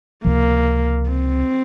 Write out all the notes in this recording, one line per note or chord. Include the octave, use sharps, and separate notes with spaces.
C#2 C3 F3 A#3
C4